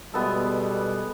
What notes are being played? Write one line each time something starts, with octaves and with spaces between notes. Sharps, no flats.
B2 G3 G#3 B3 A4